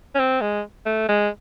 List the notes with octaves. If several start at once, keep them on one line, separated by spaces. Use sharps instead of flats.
C#4
C4
G#3
A3
G#3